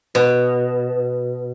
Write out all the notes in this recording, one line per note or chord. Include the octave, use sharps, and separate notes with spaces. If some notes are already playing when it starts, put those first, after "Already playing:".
B2